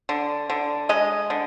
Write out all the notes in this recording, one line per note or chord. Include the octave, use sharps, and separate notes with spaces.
D3
D3
G#3 D#5
D3